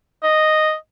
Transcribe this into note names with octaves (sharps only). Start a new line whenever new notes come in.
D#5